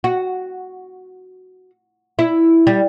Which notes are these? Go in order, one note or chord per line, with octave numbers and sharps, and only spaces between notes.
F#4
E4
G3